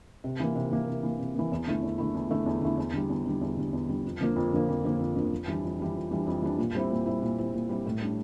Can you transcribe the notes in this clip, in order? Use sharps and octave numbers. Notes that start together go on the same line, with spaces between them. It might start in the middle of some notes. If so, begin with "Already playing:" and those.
C3
E3 A#3
C3
E3 A#3
C3
E3 A#3
C3
E3 A#3
E2
D3 A3 E4
E2
D3 A3 E4
E2
D3 A3 E4
E2
D3 A3 E4
E2
D3 G3
E2
D3 G3
E2
D3 G3
E2
D3 G3
F2
D3 F3 A#3
F2
D3 F3 A#3
F2
D3 F3 A#3
F2
D3 F3 A#3
F2
E3 G3 D4
F2
E3 G3 D4
F2
E3 G3 D4
F2
E3 G3 D4
A#2
G3 C4 E4
A#2
G3 C4 E4
A#2
G3 C4 E4
A#2
G3 C4 E4
A2
G3 D4